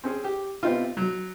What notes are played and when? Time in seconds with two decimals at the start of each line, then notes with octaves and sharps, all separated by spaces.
0.04 C4 C#4 G#4
0.24 G4
0.63 C3 B3 C4 D#4 F4
0.97 F#3